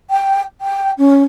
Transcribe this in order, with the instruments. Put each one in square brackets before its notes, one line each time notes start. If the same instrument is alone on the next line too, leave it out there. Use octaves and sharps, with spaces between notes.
[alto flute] G5
G5
C#4